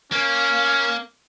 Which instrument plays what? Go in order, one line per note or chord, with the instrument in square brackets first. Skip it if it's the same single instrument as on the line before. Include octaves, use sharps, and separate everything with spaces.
[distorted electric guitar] A#3 [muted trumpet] C#4